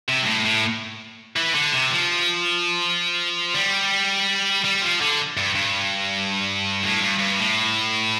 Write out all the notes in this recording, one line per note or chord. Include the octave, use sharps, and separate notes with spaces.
C3
G2
A2
A2
E3
D3
C3
F3
G3
G3
F3
D3
G2
G2
A2
G2
G2
A2